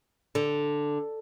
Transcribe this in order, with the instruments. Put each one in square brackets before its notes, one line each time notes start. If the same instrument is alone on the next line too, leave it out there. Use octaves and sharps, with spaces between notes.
[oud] D3